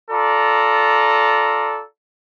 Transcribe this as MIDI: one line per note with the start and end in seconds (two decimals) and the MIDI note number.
0.11 1.82 65
0.11 1.82 69
0.11 1.82 74
0.11 1.82 82